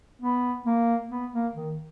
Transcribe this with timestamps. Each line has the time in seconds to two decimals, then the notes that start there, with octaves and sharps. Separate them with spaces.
0.21 B3
0.66 A#3
1.10 B3
1.32 A#3
1.55 D#3